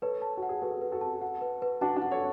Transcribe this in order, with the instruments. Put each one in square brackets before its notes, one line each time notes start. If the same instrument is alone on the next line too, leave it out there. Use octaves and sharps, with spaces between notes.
[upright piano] A4 C#5 [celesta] B4
[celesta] A5
[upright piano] F#4
[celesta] F#5
[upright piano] G#4
[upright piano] F#4 A4 [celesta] B4
[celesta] B4
[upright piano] F#4 A4
[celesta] A5
F#5
B4
B4
[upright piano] D4 F#4 [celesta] A5
[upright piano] D4 F#4
[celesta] F#5
[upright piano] A4 C#5